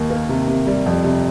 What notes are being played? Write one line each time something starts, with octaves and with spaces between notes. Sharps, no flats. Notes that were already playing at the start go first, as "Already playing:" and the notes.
Already playing: D#2
A#3
C3
C3
G3
F2
C3